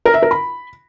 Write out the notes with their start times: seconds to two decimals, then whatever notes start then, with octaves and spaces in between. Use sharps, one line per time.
0.06 A#4
0.14 E5
0.22 A#4
0.31 B5